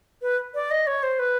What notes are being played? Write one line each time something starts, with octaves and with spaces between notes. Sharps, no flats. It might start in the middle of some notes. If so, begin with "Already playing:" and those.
B4
D5
D#5
C#5
C5
B4